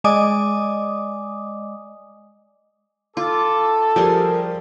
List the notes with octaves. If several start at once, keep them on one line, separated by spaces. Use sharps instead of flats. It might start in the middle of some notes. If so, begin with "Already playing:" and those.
G#3 D5 D#5 G#5 D6 D#6
F4 A4 D6
F3 G3 G4 G#4 A#4 C6